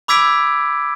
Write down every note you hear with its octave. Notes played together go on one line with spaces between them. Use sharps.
B5 D6 E6 G#6 B6 D7